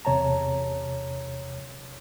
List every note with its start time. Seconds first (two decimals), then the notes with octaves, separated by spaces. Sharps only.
0.05 E2 C3 C#5 A5 A#5